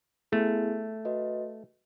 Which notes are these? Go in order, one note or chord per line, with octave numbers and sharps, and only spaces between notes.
A3 B3 E4 G#4
F#4 B4 D#5